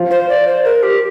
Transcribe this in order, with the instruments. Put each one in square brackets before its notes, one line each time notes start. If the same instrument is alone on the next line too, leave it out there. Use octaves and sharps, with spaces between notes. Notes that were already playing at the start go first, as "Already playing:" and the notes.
Already playing: [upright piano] F3 F4
[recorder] C5
D5
C5
A#4
G4